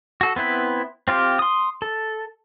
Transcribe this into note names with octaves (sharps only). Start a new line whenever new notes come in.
F#4 A4
B3 C4 E4 B4
C4 F4 G4
C6 D#6
A4